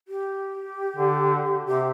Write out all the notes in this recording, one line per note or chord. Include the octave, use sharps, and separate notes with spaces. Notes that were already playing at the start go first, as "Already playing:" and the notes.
G4
D3
C3 G4